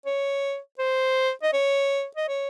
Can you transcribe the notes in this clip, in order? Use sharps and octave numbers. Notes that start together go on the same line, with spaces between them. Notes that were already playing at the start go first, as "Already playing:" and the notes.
C#5
C5
D#5
C#5
D#5
C#5